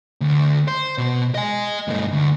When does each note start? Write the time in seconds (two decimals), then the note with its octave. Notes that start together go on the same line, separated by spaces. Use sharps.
0.21 D2
0.68 C5
0.98 B2
1.35 D#5 G#5
1.88 G2 A3
2.12 D2